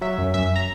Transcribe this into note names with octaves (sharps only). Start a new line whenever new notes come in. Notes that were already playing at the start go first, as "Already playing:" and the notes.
F#3 E5
F#2
F#2 E5
A#5